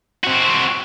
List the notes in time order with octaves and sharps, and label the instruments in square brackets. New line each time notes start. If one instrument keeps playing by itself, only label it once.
[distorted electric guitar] C4 F#4